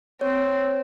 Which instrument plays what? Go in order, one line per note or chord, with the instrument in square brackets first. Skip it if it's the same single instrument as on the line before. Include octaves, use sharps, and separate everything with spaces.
[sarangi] C4 [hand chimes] C#5